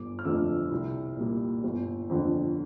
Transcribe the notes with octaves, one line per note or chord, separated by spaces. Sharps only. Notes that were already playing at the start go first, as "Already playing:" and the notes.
Already playing: G1 D6
F6
F2 D3 A3 E6
C2
A#2 G3 A#3
G1
F2 D3